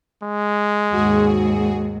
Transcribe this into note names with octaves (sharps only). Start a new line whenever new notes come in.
G#3
D#2 G#2 F#4 G#4